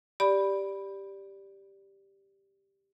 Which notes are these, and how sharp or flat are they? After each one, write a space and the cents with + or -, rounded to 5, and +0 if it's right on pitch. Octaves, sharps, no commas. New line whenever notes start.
G4 +0 D5 -5 B5 +0